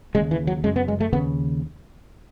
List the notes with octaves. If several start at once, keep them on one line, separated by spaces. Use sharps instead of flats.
D#2 C#3 G#3
E3
F#3
F#2 C#3 G#3
B3
G#3
A3
D#2 C#3 B3